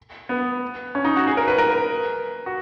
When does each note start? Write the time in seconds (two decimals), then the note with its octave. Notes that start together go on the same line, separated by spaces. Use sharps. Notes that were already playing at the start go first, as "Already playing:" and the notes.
0.29 B3
0.95 C#4
1.05 D#4
1.16 F#4
1.27 G#4
1.37 A#4
1.48 B4
1.58 A#4
2.46 F#4